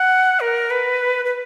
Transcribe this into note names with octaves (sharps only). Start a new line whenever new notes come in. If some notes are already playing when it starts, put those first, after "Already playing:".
Already playing: F#5
A#4
B4
B4